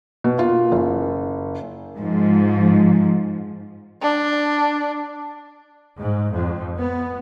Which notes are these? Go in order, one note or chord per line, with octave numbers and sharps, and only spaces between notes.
B2
A#3 F4
F#1
G#2 F3
D4
G#2
F2
B3